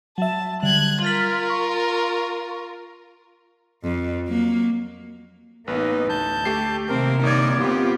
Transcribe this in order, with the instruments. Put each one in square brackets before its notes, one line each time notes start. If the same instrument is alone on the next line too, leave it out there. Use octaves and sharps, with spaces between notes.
[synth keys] F#3 E5 [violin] A5
[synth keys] D3 G3 [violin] F#6 G#6
[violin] F4 A#4 [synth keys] F6 A6 B6
[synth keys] C#6
[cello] F2
F#3 A#3
[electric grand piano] A1 [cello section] A#3 B3 D#4 [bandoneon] B4
[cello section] D2 [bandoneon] A5 G6
[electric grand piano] A3 G4 C7
[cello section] C3 D#3 A#3 [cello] C4 [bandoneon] A#4
[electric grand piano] G1 G#6 [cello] D#4 D5
[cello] B3 [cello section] C4 F4 G4